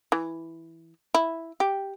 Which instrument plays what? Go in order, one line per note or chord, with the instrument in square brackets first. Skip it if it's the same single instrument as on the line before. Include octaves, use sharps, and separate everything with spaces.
[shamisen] E3
E4
G4